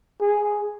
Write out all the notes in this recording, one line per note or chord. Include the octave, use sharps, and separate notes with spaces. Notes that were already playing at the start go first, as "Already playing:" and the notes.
G#4